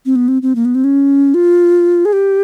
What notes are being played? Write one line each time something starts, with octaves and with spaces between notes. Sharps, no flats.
C4
B3
C4
C4
A#3
B3
C4
C#4
F4
G#4
G4